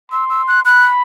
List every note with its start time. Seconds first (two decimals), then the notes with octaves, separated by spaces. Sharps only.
0.12 C6 E6
0.30 E6
0.48 F#6
0.65 B5 F#6